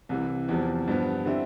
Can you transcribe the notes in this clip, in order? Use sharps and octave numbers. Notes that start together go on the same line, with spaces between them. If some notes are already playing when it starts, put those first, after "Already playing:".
C2 C3 E3
E2 C3 F3
G2 F3 B3
D3 G3 C4 E4